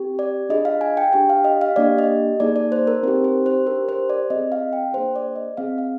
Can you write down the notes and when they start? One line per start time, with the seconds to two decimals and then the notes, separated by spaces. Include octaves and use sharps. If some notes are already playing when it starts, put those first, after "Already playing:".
Already playing: C4 G4
0.19 D5
0.49 D4 F4 G#4 D#5
0.65 F5
0.81 G#5
0.97 G5
1.13 D4 G4 G5
1.30 F5
1.44 D#5
1.61 F5
1.76 A#3 D4 G4 D5
1.98 D#5
2.40 A#3 D#4 G#4 D5
2.56 D5
2.72 C5
2.87 A#4
3.03 C4 D#4 G4 C5
3.24 C5
3.46 C5
3.66 D4 G4 A#4
3.89 C5
4.09 D5
4.30 C4 F4 G#4 D#5
4.52 F5
4.73 G5
4.94 A#3 D4 G#4 C5
5.16 D5
5.36 D#5
5.57 C4 F4 G#4 F5
5.78 F5